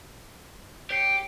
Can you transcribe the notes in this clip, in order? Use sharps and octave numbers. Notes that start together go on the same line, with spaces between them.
G4 C#5 C7 C#7